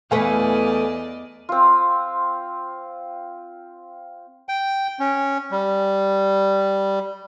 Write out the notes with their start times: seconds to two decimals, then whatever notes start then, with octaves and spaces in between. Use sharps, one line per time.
0.11 E2 E3 A3 B4 D5 D#5 F5 G#5
1.49 C4 F4
4.49 G5
5.00 C#4
5.51 G3